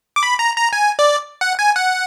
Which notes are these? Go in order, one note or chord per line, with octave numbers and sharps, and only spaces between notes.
D6
B5
A#5
A#5
G#5
D5
F#5
G#5
F#5